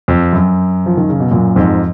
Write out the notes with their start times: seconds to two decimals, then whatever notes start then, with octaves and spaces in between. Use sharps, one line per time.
0.08 F2
0.33 F#2
0.86 F3
0.97 D#3
1.09 C#3
1.20 B2
1.31 F#2 A#2
1.56 F2 G#2